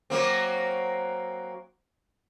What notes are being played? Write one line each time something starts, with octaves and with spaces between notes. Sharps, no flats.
F#3 A#3 C4